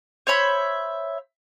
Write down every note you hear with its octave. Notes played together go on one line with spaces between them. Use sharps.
C5 C#5 E5 B5